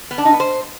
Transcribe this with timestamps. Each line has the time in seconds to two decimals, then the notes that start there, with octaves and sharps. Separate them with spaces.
0.11 B3
0.18 D4
0.25 D#4
0.33 B3
0.40 C5